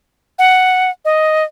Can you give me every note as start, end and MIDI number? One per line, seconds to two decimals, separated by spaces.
0.39 0.90 78
1.05 1.44 75